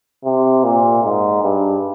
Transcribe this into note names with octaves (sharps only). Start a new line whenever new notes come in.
C3
A#2
G#2
G2